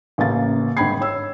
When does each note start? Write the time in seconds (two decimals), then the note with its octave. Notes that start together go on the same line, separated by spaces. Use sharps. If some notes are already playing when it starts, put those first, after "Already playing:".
0.18 A1 C#3 A#3 F5 A6
0.77 G#1 G2 G5 B5 G#6 C7
1.01 C#5 E6